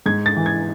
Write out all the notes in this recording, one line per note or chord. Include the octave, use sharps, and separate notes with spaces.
G#2 G#6
A6
E3
G#6